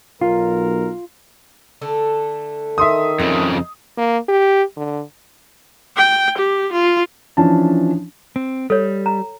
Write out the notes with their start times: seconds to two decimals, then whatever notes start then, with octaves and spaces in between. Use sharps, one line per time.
0.21 B1 F4 A#4
1.81 D3 A3 A4
2.78 D#3 E5 C6 D#6
3.19 F2 C#3 C4 D#4
3.97 A#3
4.29 G4
4.77 D3
5.97 G5
6.38 G4
6.72 F4
7.37 E3 F3 C#4 D4 A5
8.36 C4
8.70 G3 A4 C#5
9.06 A#5